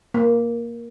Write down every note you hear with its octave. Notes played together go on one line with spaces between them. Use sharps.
A#3